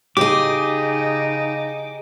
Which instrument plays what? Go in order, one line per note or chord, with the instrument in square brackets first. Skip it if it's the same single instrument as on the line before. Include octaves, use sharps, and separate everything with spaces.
[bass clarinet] C#3 [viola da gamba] D#4 [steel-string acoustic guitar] G4 G#4 [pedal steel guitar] D6